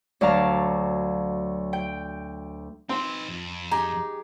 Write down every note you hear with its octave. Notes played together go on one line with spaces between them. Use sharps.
D2 F#3 D5 F5 A5 A#5
G5
C4 D#4 B4
F2
D#4 G4 G#4 A#5